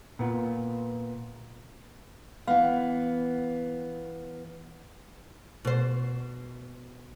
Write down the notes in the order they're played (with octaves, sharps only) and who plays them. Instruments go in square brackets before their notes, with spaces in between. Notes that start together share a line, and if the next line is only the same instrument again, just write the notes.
[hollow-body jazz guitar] A#2 B3 F4
[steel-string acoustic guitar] E3 B3 [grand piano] F5
[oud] B2 C5